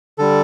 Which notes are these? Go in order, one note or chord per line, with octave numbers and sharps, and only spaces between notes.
D3 G3 A4